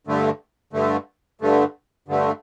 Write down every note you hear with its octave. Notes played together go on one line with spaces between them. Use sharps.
G2 D3 A3
G2 D3 A3
G2 D3 A3
G2 D3 A3